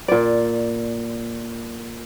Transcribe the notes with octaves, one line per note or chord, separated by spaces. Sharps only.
A#2 D5